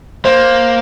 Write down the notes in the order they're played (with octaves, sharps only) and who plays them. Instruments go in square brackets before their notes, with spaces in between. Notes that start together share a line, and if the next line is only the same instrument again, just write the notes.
[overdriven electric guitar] A#3 [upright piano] C5